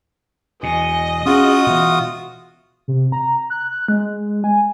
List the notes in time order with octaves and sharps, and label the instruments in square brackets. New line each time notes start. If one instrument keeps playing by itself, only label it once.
[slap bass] E2 B2 [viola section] D#5 [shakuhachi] G#5
[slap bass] C#4 [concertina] F4 F#4 D#6 [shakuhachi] G#4
[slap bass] B2 E3 [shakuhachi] E5
[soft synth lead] C3
A#5
F#6
G#3
G#5